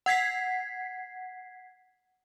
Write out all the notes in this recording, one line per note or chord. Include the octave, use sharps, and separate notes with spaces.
F#5 G#6 B6 C7